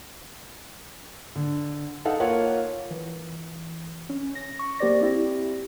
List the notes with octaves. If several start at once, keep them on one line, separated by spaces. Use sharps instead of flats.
D3
D#4 A4 F5 F#5
A#3 F4 A#4 C#5 F5 F#5
E3
C#4
A#6
C#6
A#3 G4 C5 D5 A#6
C4 E4 G4